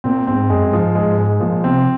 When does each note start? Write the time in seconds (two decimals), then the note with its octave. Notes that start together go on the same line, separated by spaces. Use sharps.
0.04 A#2 C4
0.27 G#2 C4
0.50 F#2 G#3
0.72 G#2 F3
0.95 G#3
1.06 G#2
1.18 G#3
1.40 A#2 F3
1.64 C3 C4